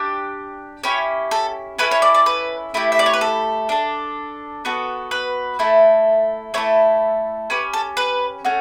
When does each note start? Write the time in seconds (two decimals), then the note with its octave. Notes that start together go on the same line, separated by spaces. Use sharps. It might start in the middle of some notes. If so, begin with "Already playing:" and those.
Already playing: D4 G4
0.83 C#4 E4 G4 C#5
1.31 A4
1.79 C#4 E4 A4 B4
1.91 C#5
2.02 D5
2.15 D5
2.26 B4
2.74 A3 E4 G4
2.92 E5
2.99 D5
3.06 C#5
3.13 B4
3.21 A4
3.69 D4 A4
4.65 B3 F#4 A4
5.11 B4
5.59 A3 E4 A4
6.54 A3 E4 A4 C#5
7.50 C#4 G4 B4
7.73 A4
7.97 B4
8.45 A3 C#4 F#4